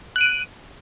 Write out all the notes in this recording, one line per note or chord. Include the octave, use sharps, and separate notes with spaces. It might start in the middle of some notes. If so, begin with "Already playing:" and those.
F#6 D7 D#7